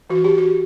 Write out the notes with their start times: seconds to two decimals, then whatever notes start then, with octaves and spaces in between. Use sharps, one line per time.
0.10 E3 F#4
0.24 G4
0.38 F#4